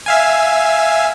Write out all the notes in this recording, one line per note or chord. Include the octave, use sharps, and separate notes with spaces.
E5 F5 G#5